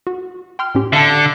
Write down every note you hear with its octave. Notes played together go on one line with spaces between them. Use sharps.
F#4
G5 C6 F6
A2 C#4 G4
D3 E5 F5 A5